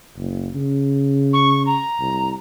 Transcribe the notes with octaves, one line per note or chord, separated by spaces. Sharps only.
F#1
C#3
C#6
A#5
C2